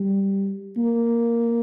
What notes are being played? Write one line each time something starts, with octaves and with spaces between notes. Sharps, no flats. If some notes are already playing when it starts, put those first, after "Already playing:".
Already playing: G3
A#3